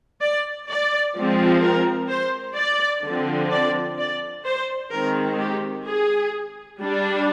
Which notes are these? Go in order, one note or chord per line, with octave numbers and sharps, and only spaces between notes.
D5
D5
F3 G#3 C4
A#4
C5
D5
D3 F3 C4
D5
D5
C5
D#3 G#3 C4 A#4
G4
G#4
G3 D4